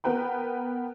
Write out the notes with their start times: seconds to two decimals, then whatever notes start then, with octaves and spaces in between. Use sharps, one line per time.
0.04 B3 A#4 B4 G5 B5